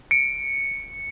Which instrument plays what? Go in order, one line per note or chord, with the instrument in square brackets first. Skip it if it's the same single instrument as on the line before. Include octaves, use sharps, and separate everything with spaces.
[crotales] C#7 [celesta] D7